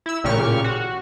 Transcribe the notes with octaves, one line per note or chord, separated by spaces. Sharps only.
E4 E6
A1 A#2 C#3 G4 C#6 F6
F#4